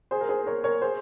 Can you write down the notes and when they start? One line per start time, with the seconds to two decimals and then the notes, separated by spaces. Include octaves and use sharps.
0.11 G#4 C5
0.21 A#4
0.29 G#4 C5
0.46 A#4 C#5
0.64 A#4 C#5
0.82 G#4 C5